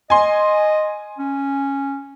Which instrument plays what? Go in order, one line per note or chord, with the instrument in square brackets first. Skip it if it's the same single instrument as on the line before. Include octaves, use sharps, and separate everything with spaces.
[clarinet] D#5 [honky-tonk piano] G#5 C6
[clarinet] C#4